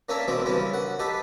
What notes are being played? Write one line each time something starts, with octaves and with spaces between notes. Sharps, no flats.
A#3 C#4 D4 A#4 C#5 E5
B2 E3 G#3 C4 D6
G2 C#3 A#3 C#4 E4
F#5
D#4 G4 A4 B4